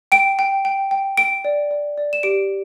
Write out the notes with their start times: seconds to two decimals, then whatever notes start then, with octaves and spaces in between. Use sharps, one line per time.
0.12 G5 D7
0.39 G5
0.65 G5
0.91 G5
1.17 G5 D7
1.45 D5
1.71 D5
1.98 D5
2.13 E7
2.23 G4 D7